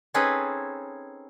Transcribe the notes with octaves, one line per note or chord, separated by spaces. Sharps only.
C4 C#4 D#4 G#4 A4 B4